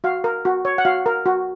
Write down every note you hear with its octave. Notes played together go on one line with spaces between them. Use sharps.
F#4 F5
A#4
F#4
C#5
F#5
F#4 F5
A#4
F#4